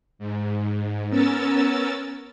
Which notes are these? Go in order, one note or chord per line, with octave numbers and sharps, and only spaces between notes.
G#2
B3 C#4 A#4 E6 A6